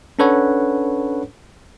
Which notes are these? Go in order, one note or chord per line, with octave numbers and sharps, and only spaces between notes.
C#4 D4 A4 B4 C#5 F#5